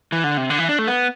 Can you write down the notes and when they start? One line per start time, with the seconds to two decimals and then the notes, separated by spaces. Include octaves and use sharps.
0.12 E3
0.24 D3
0.37 C3
0.50 D3
0.59 E3
0.69 D4
0.79 A3
0.87 B3